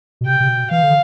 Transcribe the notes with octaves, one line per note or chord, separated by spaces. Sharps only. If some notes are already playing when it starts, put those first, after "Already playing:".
B2
C3 G5
C3
B2
E3 F5
D3